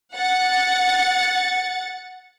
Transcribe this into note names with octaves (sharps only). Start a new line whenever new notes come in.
F#5 A6 C#7